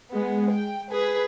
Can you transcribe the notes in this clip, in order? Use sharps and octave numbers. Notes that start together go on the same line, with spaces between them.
G#3 B3
G5
G#4 B4